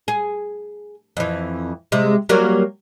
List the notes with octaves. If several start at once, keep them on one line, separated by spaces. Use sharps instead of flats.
G#4
F2 E3
C3 G#3
F#3 G3 A#3